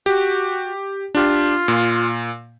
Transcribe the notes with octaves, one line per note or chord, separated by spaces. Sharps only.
F#4 G4
D4 F4 G4
A#2